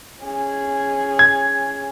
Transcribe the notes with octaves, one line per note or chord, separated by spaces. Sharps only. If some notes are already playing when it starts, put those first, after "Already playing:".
C#4 G#4
G#6